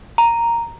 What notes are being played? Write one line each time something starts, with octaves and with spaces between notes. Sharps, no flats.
A#5